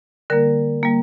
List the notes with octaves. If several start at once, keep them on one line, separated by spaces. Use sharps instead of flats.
D3 G3 A#3 A#4
G3 A#3